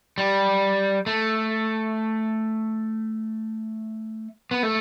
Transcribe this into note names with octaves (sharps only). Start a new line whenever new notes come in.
G3
A3
B3
A3